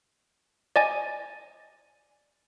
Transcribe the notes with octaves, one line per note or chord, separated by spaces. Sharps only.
D5 D#5 G#5